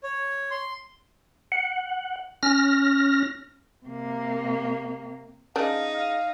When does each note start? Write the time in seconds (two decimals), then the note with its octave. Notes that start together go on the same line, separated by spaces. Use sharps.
0.04 C#5
0.51 C6
1.52 F#5
2.43 C#4 F6 A#6
3.86 C3 A#3
5.56 C#3 D4 D#4 F5
5.93 F5